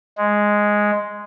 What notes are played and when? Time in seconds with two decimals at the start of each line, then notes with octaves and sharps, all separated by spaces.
0.17 G#3